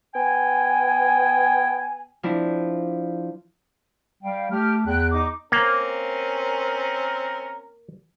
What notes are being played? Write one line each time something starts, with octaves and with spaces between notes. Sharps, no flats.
B3 G5 G#5
F3 C4 D4 E4
G3 F5 G5
A3 G4 F6
E2 G5 F#6
D#4 D6
A#3 C4 C#4 A#4